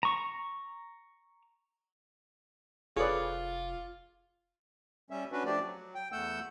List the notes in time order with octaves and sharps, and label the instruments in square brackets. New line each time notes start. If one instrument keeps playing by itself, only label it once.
[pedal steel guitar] A#5 C#6
[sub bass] F1 [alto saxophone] F4 [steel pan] G#4 A4 B4 [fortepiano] C#5 D5
[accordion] G3 C#4 E5
C#4 D4 F#4 B4
F3 A3 D4 G4 D5
F#3
G5
E2 A3 F#5 E6 G6